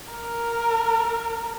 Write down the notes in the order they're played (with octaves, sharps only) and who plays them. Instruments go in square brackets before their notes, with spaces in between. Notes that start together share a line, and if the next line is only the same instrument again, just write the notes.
[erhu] A#4